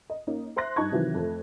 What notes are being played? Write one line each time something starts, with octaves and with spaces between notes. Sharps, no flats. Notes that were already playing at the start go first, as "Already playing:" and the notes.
D#5
A#3 C#4 D#4
C5 E5 C6 F#6 A#6
G2 D#4 A5 C#6 G#6
C3 D#3 E3 F#3
F2 A3